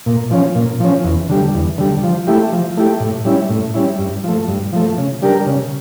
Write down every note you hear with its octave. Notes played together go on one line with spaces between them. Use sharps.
A#2
F3 C#4
A#2
F3 C#4
E2
D3 G3
E2
D3 G3
F3
A3 E4 G4
F3
A3 E4 G4
A2
G3 C#4 E4
A2
G3 C#4 E4
G2
F3 A3
G2
F3 A3
C#3
G3 D4 G4 A#4
C#3